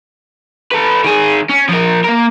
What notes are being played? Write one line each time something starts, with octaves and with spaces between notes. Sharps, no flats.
A4 B4
D#3 G#4
C#4
F3 A#4
A#3 A#4